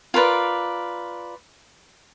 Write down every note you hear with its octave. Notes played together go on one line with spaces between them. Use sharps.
F4 A#4 B4 D5